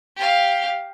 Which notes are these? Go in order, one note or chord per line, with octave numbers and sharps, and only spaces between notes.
G4 F5